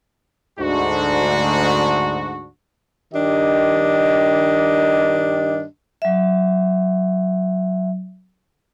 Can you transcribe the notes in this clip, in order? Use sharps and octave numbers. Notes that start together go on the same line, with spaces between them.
D2 G#2 D4 F#4
G2 D#3 D4 G4 D#5
F#3 E5